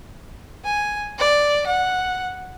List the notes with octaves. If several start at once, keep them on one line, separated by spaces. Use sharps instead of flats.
G#5
D5
F#5